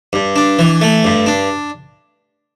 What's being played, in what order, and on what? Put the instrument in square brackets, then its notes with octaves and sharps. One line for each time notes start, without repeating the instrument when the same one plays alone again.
[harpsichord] G2
D4
E3
A3
G2
D4